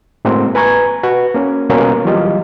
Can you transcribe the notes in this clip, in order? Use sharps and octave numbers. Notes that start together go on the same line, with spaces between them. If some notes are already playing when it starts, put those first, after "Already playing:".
A2 G#3 A#3 C4 F#4
B4 G#5 A#5 C#6 G#6
F#4 B4
A#3 C#4
B2 G3 A#3 C#4 F#4 A#4
E3 F#3 G3 F4 G4 D#5